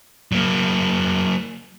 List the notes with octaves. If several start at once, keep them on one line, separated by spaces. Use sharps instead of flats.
F#3 A#3